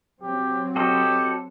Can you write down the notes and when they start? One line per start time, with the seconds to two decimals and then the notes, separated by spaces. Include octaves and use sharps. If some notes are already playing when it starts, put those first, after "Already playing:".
0.23 F#3 C4 G4
0.76 F#4 G4 A4 D#5